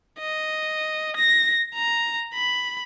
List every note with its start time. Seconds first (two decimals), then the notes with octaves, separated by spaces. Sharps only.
0.20 D#5
1.16 A#6
1.74 A#5
2.34 B5